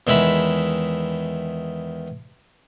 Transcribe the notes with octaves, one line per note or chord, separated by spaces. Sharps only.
E2 D#3 G#3 E4 B5